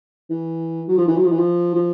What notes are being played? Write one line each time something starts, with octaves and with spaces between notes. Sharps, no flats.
E3
F#3
F3
E3
F#3
F3
E3
F3
F3